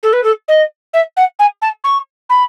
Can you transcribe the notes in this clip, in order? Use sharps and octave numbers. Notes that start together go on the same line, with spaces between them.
A4
B4
A4
D#5
E5
F#5
G#5
A5
C#6
B5